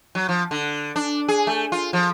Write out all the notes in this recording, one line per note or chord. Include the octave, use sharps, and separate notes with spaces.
F#3
F3
D3
D4
G#4
A3
F4
F3